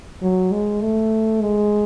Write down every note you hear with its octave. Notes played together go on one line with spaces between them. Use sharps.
F#3
G#3
A3
G#3